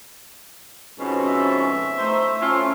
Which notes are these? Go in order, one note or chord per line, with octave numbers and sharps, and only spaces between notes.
F2 G#2 B2 C#4
E5
A3 D#4 E4 C5
A3 C#4 E4 F4